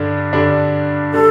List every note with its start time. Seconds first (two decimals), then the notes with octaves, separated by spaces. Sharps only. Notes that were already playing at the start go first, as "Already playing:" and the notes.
Already playing: G2 D3 G3 D4
0.33 G2 D3 G3 D4
1.12 D3 G3 A4